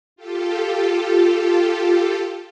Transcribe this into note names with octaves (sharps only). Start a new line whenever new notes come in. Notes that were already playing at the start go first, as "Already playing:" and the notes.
F4 G4 A4